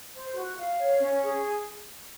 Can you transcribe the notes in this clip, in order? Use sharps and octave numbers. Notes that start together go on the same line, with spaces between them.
C5
F#4
F5
C#5
C#4
G#4